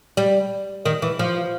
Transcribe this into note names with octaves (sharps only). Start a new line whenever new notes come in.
G3
D#3
E3
F3